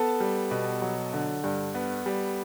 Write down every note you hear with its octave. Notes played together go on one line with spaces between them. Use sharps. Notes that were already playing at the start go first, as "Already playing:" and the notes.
Already playing: B3 A4 A5
G3
B2
F#3
D3
G2
B3
G3